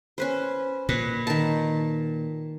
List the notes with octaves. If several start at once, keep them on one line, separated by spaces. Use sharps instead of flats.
C#4 B4 C5
A#2 B4
D#3 A5